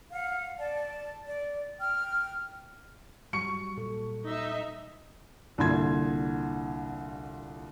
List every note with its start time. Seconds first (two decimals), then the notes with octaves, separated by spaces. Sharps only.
0.12 F5 F#5
0.59 D5 A5
1.27 D5
1.80 G5 F6
3.33 F#3 G3 C#6 C#7
3.77 A#2 A4
4.26 D#4 E5
5.58 C2 A#2 D3 C6 G#6